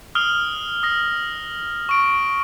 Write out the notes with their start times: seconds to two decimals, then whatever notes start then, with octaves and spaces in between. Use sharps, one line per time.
0.15 D#6 F6 F7 G7
0.83 D#6 A#6
1.89 C#6 D7